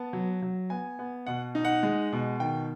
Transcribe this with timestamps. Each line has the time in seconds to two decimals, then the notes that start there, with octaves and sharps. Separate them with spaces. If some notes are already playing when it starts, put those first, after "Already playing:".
Already playing: B3 A5
0.13 F#3
0.42 F#3
0.70 B3 G#5
0.99 B3
1.27 B2 F#5
1.55 D#4
1.65 F#5
1.83 G#3
2.13 B2
2.40 D#3 G5